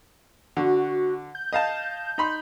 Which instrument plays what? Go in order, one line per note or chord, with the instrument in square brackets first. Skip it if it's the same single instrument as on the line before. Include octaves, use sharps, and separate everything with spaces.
[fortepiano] D3 [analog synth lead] F#4
[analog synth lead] F#4
G6
[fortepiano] D#5 F5 A5
D#4 B5 C6